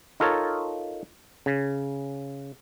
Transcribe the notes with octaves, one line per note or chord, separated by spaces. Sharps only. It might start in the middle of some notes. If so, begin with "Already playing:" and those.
D#4 F4 A4 A#4 C#5
C#3